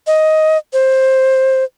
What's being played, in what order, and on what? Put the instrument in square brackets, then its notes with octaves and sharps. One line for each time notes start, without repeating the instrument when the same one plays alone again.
[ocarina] D#5
C5